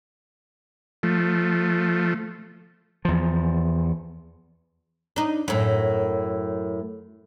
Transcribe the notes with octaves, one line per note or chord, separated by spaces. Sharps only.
F3 A3
E2 F3
D4 D#4
F#2 A2